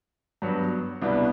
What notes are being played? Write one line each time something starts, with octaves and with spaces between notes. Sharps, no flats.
G2 F#3 B3
C2 B2 G3 B3 D4